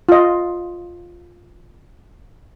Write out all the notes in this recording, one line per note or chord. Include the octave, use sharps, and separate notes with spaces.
F4 D#5